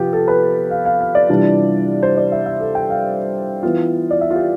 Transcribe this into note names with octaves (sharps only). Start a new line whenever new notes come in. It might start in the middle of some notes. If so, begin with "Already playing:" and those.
Already playing: C3 F3 B3 F4 G4
A4
B4
F5
F5
F5
D5
C3 E3 G3 D4 F4
C5
D5
E5
E5
A4
G5
F5
E3 B3 F4
D5
E5
F4
G4